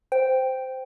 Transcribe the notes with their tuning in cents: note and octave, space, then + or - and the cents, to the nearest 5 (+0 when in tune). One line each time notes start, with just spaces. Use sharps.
C5 -10 G5 +0